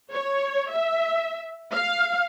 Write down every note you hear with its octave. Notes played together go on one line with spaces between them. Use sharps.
C#5
E5
F5